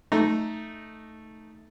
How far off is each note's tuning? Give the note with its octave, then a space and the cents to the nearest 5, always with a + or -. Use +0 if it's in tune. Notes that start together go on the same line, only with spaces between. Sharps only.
A3 +0 D#4 +0 A#5 +0